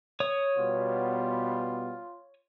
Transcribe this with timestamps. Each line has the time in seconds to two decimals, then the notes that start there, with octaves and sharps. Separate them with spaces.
0.20 C#5 D#6
0.57 B2 G3 B3 F4